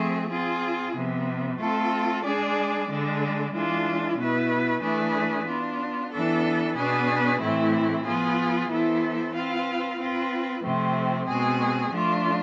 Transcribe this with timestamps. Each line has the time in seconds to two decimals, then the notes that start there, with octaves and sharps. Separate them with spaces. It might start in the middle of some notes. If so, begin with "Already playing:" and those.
Already playing: F3 A3 C4 G#4
0.30 C4 F4 G#4
0.95 C3 F3 B3
1.60 A3 C4 F4 A4
2.24 G#3 D4 G#4 D5
2.89 D3 G#3 D4
3.54 E3 G#3 D4 F4
4.18 B2 B3 E4 B4
4.82 E3 A3 D4 G#4 B4
5.47 B3 D4 F4
6.12 E3 B3 D4 A4
6.76 B2 B3 D4 G#4 B4
7.40 A2 E3 A3 C4 E4
8.05 F3 B3 F4 G#4
8.69 E3 B3 E4 A4 C5
9.34 C4 F4 B4 F5
9.99 C4 F4 B4
10.63 C3 F3 A3 C4
11.28 B2 G#3 C4 G#4
11.91 F3 A3 D4 F4